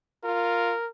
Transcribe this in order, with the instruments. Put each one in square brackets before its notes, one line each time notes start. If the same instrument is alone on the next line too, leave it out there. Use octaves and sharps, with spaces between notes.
[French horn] F4 [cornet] A#4